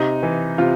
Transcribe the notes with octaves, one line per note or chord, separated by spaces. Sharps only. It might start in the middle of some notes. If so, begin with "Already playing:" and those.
Already playing: C3 D#4
E3
C3 F4